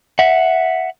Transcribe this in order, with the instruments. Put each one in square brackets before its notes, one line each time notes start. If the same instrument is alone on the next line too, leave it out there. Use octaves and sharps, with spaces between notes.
[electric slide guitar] E5 F#5